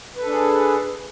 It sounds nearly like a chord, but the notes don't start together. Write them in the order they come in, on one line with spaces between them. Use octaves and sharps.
B4 A4 D4 G#4